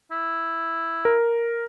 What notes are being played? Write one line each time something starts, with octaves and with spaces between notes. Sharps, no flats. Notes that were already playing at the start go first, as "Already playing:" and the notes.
E4
A#4